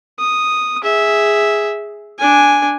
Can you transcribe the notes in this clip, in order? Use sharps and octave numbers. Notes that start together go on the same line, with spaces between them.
D#6
G#4 E5
D4 G#5